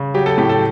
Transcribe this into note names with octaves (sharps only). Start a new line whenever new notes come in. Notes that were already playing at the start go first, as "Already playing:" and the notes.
Already playing: C#3
F#3 G4
A4
A2 G4
A4